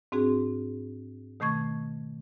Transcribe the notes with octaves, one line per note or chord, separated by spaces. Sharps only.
G#2 C4 D4 F#4 G#4
B2 D#3 A3 C#6 G#6